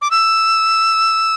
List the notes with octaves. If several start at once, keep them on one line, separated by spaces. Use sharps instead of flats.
D6
E6